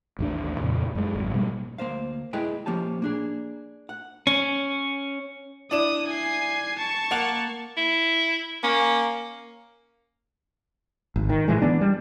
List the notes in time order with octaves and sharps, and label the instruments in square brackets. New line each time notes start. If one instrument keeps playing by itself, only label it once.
[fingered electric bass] A1 D#2 D4
F2 A#2 C#3
F#2 G#3
G#1 F#2
B2 G3 A3 A#3
[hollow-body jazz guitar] D2 A#3 A#4 C5 F5
G#3 E4 G#4 B4 D#5 G5
F3 A#3 C#4 G4 A5
A#3 D4 G#4
F#5
[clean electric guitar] C#4
[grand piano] D4 E4 E7 [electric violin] D#6
[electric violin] G#5 C7
A5 C#6
[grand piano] A#3 F#5 F7
[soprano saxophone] E4
[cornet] A#3 [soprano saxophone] C#4
[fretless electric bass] G#1
D#3
A2 E3 G#3
E3 B3 D4
G3